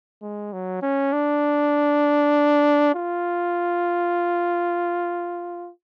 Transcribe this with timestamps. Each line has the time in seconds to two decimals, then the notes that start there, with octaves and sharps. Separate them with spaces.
0.22 G#3
0.53 F#3
0.82 C#4
1.13 D4
2.95 F4